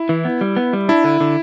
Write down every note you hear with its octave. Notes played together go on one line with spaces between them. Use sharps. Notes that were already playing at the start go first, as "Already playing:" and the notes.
Already playing: E4
E3
B3
G3
B3
G3
D4 E4
D3
D3